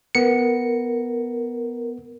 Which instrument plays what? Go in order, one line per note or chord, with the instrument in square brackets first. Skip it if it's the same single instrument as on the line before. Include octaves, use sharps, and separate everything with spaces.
[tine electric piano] B3 C#7 [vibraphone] A#4